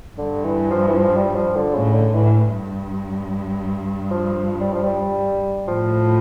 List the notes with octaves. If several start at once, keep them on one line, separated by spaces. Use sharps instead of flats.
G2 D3
E3
F3
E3
F3
G3
F3
D3
A2 C#3
D3
A2 E3
G2
F3
G3
F3
G3
A2 F3